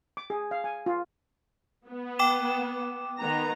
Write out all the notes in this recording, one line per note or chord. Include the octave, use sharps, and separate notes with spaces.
D6
G#4
F5
G#5
F4
B3
G5 D6 E7
D#3 B3 A#5